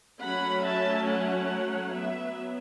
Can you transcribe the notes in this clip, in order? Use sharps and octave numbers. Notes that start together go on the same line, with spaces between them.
F#3 A3 C#4 F#5 B5
E5 A5
C#5 F#5
F#3 B3 B4 E5